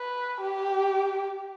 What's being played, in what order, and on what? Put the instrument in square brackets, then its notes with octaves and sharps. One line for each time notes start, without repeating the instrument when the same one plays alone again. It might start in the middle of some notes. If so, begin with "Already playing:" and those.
Already playing: [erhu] B4
G4